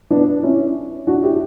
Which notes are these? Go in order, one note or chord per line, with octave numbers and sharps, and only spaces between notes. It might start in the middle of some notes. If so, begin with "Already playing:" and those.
B3 D4
C#4 E4
D4 F#4
E4 G4